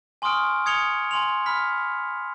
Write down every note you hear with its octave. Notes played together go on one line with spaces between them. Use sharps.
G#5 C6 C#6 D#6 F6 D7
D#6 G#6 C#7 F7 G7
G#5 C6 F7
B5 F6 B6